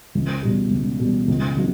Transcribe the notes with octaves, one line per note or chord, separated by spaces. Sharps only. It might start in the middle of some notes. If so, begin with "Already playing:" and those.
C#2
B2 G3
C#2
B2 G3
C#2
C#3 F#3